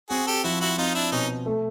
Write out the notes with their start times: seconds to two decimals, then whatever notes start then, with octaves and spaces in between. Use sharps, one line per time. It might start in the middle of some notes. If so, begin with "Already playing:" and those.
0.10 C4 F#4 G#4
0.27 G4 A4
0.44 F3 E4 F#4
0.61 E4 F#4
0.78 C4 D#4 F4
0.95 D4 E4
1.12 B2 C#4 D#4
1.46 A3